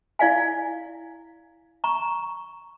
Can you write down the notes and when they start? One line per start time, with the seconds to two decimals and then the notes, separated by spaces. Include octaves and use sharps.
0.19 E4 D5 F5 G#5
1.84 A#5 C#6